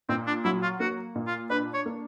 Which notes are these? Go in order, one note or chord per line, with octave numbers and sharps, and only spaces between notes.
A#2 C4
D4
F#3 E4
F4
A#3 F#4
A#2
F4
D4 B4
C#5
A#3